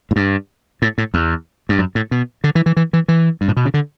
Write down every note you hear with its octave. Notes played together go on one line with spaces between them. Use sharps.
A2
G2
A2
A2
E2
G2
F#2
A2
B2
D3
E3
E3
E3
E3
E3
G2
A2
B2
C#3
D3